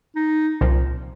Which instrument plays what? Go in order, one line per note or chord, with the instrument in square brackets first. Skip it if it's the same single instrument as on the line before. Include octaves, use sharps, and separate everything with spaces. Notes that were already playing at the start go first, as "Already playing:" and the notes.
[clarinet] D#4
[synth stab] C2 A#2 F3